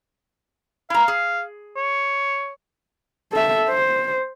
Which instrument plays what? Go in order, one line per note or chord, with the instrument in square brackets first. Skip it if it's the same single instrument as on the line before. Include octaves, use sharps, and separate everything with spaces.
[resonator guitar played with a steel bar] E4 A#5 [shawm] F5
[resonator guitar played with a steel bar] G#4
[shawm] C#5
[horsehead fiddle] A4 E5
C5